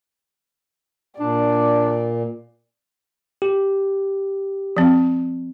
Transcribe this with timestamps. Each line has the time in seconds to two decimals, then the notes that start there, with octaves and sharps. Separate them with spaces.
1.20 A#2 D4 D5
3.42 G4
4.77 F3 C4